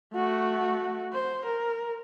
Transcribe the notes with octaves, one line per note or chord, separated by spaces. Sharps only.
A3 F#4
C5
A#4